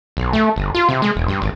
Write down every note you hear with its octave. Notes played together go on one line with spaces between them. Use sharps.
B1
A3
G1
F4
C3
G#3
E1
G2
G#1